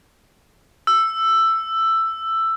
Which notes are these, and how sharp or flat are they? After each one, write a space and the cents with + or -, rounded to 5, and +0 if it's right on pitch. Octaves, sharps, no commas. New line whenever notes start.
E6 +10